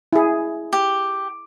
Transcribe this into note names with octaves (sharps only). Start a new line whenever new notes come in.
E4 G#4
G4